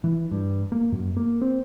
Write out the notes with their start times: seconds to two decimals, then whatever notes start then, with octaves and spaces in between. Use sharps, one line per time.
0.04 E3
0.31 G2
0.72 A#3
0.92 F#2
1.17 A#3
1.42 C4